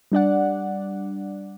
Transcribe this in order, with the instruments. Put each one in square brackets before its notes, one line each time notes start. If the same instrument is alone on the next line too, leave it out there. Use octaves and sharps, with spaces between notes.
[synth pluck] G3 D4 D5 F#5